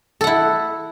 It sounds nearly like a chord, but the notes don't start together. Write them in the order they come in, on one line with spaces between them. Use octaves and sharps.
A4 F#5 E4